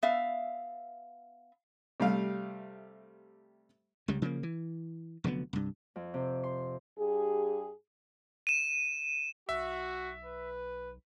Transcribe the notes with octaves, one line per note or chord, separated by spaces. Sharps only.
B3 E5 F5
C3 G3 A3 F5
C#2 C#3 G3
C#3 F3 G3 A#3
E3
F1 D3 F#3 B3
C2 G2
F2
C3
C6
G2 G4 G#4
D#7 E7
B1 F#4 E5
B4